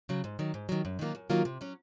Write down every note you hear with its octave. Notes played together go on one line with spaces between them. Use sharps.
C#3 F#3
G#2
D#3 F#3
G#2
D#3 F#3
F#2
D#3 F#3 A#3 F4
F#2
D#3 F#3 A#3 F4
C3
F#3 C#4